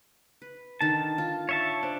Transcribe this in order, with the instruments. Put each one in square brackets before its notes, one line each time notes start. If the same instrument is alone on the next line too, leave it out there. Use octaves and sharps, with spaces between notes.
[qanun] B4
[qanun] D3 D#3 [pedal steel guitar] A5
[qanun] F4
[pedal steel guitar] C#5 E5 A5
[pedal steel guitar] D4 [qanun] C5